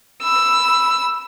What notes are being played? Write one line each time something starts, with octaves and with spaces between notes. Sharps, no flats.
B5 E6